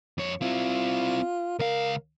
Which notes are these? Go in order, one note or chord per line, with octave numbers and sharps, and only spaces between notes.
F2 C#5
C4 E4 F4
C#2 A#4 F5